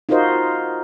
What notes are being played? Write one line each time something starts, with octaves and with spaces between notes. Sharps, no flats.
D#4 F4 F#4 A#4 C5 D#5